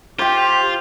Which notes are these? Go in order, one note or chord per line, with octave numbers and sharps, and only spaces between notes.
F4 G4 C5 G5